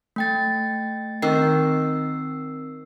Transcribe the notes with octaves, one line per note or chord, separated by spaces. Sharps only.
A3 G5 A6
D#3 C4 E6 C7